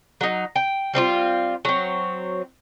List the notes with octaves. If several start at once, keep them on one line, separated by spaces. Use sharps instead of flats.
F#3 D#4
G5
G3 C4 D#4 F4
F#3 C4